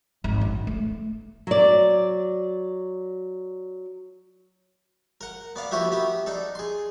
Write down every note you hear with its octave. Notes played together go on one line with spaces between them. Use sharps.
G#1
C#3
A3
F#3 D5
A#4 F#5
B3 D5 F5
F3 A#3 E4 F#4 G4 E5
B3 G4 E5
D4 D#4 A4
G#4 C6